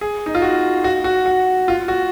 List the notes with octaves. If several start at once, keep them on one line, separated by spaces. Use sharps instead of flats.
G#4
D#4
F4
F#4
F#4
F#4
F#4
F4
F#4